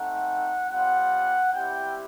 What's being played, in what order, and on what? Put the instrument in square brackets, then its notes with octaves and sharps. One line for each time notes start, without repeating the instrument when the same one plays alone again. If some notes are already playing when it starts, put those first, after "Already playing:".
Already playing: [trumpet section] A3 C4 D#4 F#5
G3 C4 F4 F#5
G3 C4 E4 G4 G5